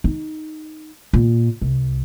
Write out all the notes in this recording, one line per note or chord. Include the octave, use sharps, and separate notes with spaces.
D#4
A#2
C2